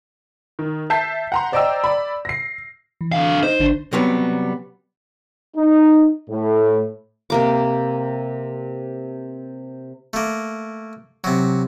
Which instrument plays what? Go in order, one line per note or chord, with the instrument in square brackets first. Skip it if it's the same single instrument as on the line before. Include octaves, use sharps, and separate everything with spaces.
[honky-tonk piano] D#3
E5 A5 G6 B6 C7
F#5 A#5 C6
C5 D5 D#5 G5 A#5 E6
D5 B5
A#6 C7
[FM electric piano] E3
[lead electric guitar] D3 F5
[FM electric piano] D#4 D#5 [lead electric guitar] C5
[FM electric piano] G#1 D3 D4
[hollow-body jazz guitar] C3 F#3 G3 B3
[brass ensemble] D#4
A2
[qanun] C3 A#3 D6
[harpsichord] A3 A#3
C3 F#3